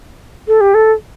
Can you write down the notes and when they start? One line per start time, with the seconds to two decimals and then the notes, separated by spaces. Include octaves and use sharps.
0.48 A4
0.61 G4
0.74 A4